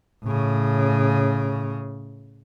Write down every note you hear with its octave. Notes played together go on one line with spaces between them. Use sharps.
A2 C#3